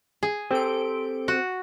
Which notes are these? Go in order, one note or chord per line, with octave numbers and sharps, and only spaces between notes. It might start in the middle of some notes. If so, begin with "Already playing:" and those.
G#4
C4 G4 A4 D7
F#4